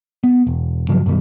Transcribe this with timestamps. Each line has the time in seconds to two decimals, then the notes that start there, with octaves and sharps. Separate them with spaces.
0.24 B3
0.47 E1
0.89 G2 C#3 F3 F#3
1.06 F#2 B2 D#3 G3